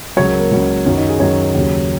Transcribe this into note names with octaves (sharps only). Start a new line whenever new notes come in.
C#2 C#3 F#3 C#5
A#4
A#3
C#2 C#3 F#3
F#2 D#3 F#3 C#4
D#4
G#4
F#2 D#3 F#3 C#5
D#2 C#3 F#3